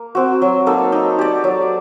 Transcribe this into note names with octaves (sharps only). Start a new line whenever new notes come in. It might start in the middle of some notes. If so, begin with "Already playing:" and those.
Already playing: A#3
C4 F#4
F#3
A#3 D#4 A4
D#4
G4 D5
F#3